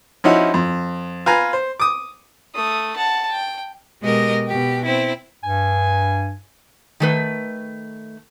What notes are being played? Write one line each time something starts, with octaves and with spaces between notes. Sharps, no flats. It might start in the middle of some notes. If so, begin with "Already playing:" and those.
F3 C#4 D#4 E4 F#4
F2
F4 B4 G#5 A#5
C5
D6 D#6
A3 D#6
F#5 A5
G5
B2 G#3 G4 A#4 D#5
B2 G4
C4 E4
G2 G#5
D#3 A3 B4